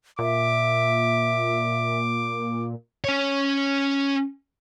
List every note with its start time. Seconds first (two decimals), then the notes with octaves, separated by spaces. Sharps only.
0.19 A#2 E5 D6
3.04 C#4 C#5